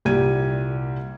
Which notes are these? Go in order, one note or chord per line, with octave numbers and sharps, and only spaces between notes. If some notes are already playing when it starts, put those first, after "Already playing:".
C2 A#2 G3 G4 G#6 D#7